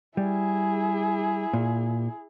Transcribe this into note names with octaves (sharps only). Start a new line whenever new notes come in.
G3 E4 G#4
A#2